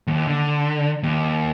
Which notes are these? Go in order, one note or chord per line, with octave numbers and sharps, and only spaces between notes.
D#2
D3
D#2